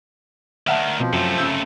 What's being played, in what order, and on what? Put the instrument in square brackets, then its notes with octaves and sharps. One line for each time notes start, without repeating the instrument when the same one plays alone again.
[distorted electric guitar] D2 D#3 [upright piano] E5 F#5 A5 [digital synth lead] F6
[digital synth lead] B2 [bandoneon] F3 [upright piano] C4
[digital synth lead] F#2 [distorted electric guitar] C3 A3
[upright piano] F#1 C#3 G6 [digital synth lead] E6